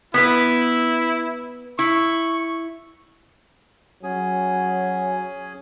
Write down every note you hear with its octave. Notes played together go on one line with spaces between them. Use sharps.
B3 E4 B4
E4 C#6
F#3 C#4 G#4 G#5